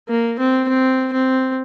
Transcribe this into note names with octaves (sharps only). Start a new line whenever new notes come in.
A#3
C4
C4
C4